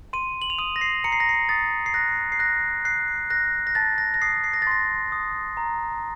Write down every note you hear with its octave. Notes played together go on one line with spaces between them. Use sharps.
C6 D#7
F#7
F7
D#6 D#7
A#6
C7
A#5 C#7
C7
A#6
C7
D#6 A6
C7
F#6 A#6
C7
F#6 A#6
F#6 C7
F#6 A#6
A#6
A5 A6
A#6
A#6
D#6 C7
C7
A#6
A6
C6 A#6
D#6
A#5